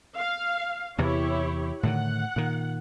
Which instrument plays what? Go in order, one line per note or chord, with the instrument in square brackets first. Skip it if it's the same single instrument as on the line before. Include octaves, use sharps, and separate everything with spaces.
[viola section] F5
[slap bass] E2 C3 E3 [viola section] E4 G4 C#5
[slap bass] A2 D3 D#3 [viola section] F#5
[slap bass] A#2 D#3